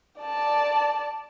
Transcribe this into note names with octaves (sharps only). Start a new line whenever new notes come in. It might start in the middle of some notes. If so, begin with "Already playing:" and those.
D5 A5